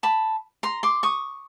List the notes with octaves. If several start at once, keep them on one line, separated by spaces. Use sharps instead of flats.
A5 B5
A#5 C6
C6 D6
C#6 D#6